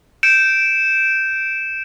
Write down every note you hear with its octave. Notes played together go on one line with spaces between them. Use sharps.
G6 C#7 D7 E7